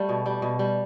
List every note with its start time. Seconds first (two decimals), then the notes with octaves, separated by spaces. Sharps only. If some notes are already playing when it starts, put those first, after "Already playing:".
Already playing: G3 A3
0.09 B2
0.26 G3
0.42 B2
0.59 G3